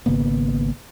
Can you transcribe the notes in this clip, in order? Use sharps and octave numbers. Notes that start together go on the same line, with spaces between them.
G#1 C#3 A#3 B3